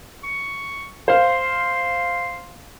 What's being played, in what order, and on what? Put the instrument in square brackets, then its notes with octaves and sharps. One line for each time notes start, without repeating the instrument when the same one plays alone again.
[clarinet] C#6
[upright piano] C5 F5 [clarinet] C6